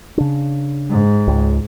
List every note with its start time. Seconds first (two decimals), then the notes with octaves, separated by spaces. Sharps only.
0.18 C#3 D4
0.90 G#2
1.27 C#2